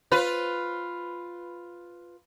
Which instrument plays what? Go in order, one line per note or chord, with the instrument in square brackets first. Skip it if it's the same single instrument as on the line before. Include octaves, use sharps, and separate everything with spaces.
[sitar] F4 B4